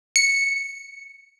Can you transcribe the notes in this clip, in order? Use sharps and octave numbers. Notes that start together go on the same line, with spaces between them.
C#7